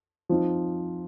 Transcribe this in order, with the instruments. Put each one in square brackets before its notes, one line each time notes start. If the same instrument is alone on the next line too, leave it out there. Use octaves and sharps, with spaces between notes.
[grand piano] F3 C4 D#4